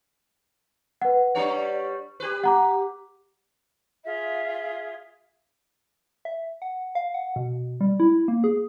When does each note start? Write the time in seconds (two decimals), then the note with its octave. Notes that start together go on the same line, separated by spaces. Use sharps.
1.02 B4 F#5
1.35 G3 D4 C#5
2.20 G4 B4
2.44 F#5 A#5 D6
4.04 F4 G#4 E5
6.25 E5
6.62 F#5
6.95 F5
7.14 F#5
7.36 B2
7.81 G3
8.00 E4
8.28 A#3
8.44 G#4